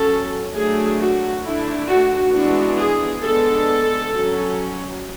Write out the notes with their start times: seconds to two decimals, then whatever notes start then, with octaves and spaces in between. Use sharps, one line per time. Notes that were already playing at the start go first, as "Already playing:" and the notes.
Already playing: F#3 C#4 A4
0.54 F#3 A3 D4 G#4
1.00 F#4
1.44 D3 A3 D4 E4
1.89 F#4
2.33 E3 G#3 B3 D4 F#4
2.79 G#4
3.23 G#3 B3 D4 A4
4.13 F#3 C#4